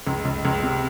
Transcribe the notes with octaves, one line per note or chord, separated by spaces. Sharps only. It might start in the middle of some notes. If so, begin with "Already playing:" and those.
C#2
C#2
C#2
C3